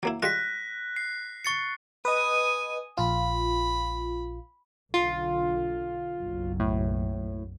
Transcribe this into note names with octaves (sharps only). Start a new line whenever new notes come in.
F#3 A#3 E4
G3 G#3 F4 F#6 A#6 B6
C7
C#6 A6 C#7
B4 D#5 G#5 D#6
A#1 F4 B5
B1 D3 F4
F#1 B1 F#3
A2